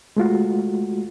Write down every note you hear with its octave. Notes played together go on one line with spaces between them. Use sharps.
G#3 A3 F4 F#4